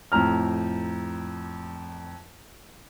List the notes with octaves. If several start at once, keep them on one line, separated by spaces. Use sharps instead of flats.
F2 A2 A#5 F6